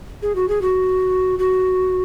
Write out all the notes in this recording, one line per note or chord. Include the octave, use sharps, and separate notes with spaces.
G#4
F#4
G#4
F#4
F#4